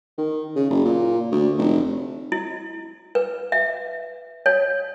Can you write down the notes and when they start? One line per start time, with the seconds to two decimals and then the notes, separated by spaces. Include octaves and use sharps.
0.18 D#3
0.56 C#3
0.70 F#1
0.85 A#2
1.31 D2
1.58 F1
2.32 E4
3.15 B4
3.52 E5
4.46 C#5